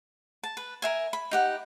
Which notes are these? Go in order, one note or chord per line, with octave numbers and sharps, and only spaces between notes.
A5
B4
A#4 E5 G#5
B5
D#4 G4 F#5